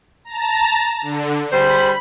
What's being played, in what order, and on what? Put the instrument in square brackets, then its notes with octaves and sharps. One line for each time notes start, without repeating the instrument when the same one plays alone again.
[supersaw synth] A5 A#5
D3
[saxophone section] G3 G#4 C5 [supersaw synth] B5